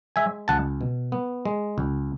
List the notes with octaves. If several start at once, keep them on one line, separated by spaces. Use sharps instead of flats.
G#3 E5 G#5
C#2 F#5 A5
B2
B3
G#3
C#2